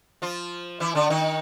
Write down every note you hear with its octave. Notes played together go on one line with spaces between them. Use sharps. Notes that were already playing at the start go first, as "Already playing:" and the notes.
F3 F4
E3 E4
D3 D4
D#3 D#4